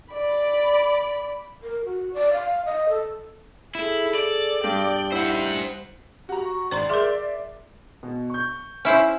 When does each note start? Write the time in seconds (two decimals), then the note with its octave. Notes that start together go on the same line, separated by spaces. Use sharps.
0.13 D5 B5
1.63 A#4
1.85 F#4
2.14 D5
2.33 F5
2.65 D#5
2.89 A4
3.75 E4 G#4 A4
4.15 D5
4.64 G2 G5
5.12 E4 C5 F#5
6.29 F#4 G4 A#5
6.45 C#6
6.71 G#1 C5 D5 A#5 C6
6.90 G#4 A#4 E5 C6 D6
8.03 B2
8.30 C#6 G6
8.85 C#4 E4 C5 E5 G#5